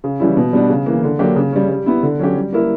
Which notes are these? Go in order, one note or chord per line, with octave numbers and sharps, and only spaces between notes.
C#3
E3 G3 C#4 E4
B2
G3 B3 D4
C#3
E3 A#3
D3
F#3 A#3 D4 G4
C#3
G3 C#4
G3
B3 E4
D3
F#3 C#4 G4
G3
A#3 E4 A#4